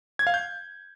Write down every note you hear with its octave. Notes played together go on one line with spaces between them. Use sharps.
G#6
F5
G6